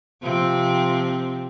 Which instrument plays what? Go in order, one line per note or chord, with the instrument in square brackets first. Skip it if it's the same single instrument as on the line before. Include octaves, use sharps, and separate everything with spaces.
[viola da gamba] C3 F3 C4